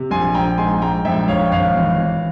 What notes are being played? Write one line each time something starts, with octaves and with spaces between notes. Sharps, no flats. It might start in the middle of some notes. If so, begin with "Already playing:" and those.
Already playing: C3
A#1 G#5 C6
A#1 G5 A#5
G#2 G#5 C6
G#2 G5 A#5
A#1 E5 G5
A#1 C#5 F5
G5
G#1 C#5 F5
E3
E3